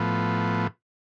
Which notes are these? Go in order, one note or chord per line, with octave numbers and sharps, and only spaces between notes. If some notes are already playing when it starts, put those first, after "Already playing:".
Already playing: A2 F3 B3